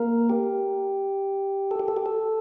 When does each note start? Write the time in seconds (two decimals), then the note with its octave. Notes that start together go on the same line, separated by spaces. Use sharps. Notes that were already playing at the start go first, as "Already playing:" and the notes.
Already playing: A#3 A#4
0.30 G4
1.71 A4
1.80 G4
1.88 A4
1.97 G4
2.06 A4